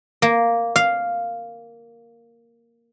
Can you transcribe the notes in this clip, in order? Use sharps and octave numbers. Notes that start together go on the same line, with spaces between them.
A#3
F5